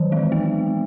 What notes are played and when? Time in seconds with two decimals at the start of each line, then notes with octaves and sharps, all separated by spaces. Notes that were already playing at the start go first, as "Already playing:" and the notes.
Already playing: D#3 E3 F#3
0.12 G#3
0.32 B3